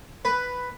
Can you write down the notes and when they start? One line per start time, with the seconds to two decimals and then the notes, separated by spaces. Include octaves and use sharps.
0.25 B4